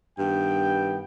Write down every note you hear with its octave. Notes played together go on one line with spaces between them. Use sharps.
G2 D#3 B3 G5